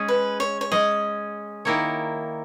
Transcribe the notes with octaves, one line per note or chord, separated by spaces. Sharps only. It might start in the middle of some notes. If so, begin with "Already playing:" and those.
Already playing: G#3 C#4 G#4
B4
C#5
C#5
G#3 C#4 G#4 D#5
D#3 A#3 E4 A#4 C#5